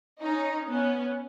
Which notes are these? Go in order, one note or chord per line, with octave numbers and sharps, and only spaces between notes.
C#4 D#4
B3 C#4